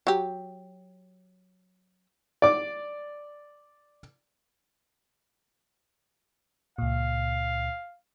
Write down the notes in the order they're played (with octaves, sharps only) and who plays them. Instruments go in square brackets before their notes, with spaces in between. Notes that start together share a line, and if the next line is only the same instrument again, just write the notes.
[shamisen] F#3 G4
[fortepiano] D5 D6
[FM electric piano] C#2 A#2 [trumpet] F5